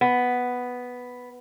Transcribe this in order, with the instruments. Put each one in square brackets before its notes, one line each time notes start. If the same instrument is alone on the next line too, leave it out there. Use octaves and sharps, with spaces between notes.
[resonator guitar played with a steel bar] B3